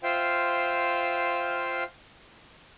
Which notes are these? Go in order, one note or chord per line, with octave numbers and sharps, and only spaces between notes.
F4 C5 E5 F5 G5